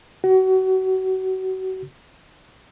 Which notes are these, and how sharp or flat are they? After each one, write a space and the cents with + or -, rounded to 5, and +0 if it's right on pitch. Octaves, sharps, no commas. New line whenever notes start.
F#4 +30